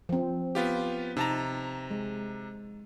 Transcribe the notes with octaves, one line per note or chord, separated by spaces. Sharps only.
F3 C4
B3 F4 G4
C3 D#4 A5 A#5
G#3